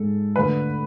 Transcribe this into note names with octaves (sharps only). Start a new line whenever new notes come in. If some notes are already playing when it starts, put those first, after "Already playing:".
Already playing: G#2 G#3 A4
D3 A3 B4